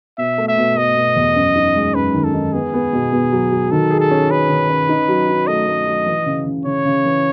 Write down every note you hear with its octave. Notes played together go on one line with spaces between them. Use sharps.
B2 E5
A3
E5
B2
A3 D#5
B2
E2
F#2
D#4
G#3
F#2 B4
D#3
A4
D#4
B3 G#4
B3
B2
B2
F#3
F#3
D#3 A4
G#4
A4
C#4
C#4 B4
D#3
C#4
D#4
F#3
D#4
A3 D#5
A3
F#3
E3
C#3
C#3
C#3 C#5
C#3
E3